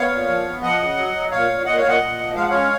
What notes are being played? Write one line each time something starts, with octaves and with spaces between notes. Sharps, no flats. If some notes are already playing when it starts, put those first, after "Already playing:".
Already playing: B3 C#5 F5
A#2
F3
B3
F3 D#5 F#5
C#3
F#3
F#3
A#2 C#5 F5
A#2
A#2 D#5 F#5
C#5 F5
A#2
D#5 F#5
A#2
F3
G#3 F5
F#5
C#4 C#5 F5